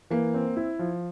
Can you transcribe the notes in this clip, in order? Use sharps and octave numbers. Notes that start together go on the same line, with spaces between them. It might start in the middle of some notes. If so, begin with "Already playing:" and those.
E3 A#3
C4
E4
F3